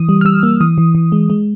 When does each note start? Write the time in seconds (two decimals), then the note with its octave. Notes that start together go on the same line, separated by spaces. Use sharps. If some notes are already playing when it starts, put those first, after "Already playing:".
Already playing: E3 D#6
0.09 G3
0.21 F6
0.25 G3 E6
0.43 A#3
0.61 E3 D#6
0.78 E3
0.95 E3
1.12 G#3
1.30 G#3